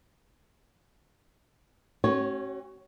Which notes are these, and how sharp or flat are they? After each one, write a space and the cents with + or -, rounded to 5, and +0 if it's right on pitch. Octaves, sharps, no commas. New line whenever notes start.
C#4 -35 F#4 +40 C#5 +5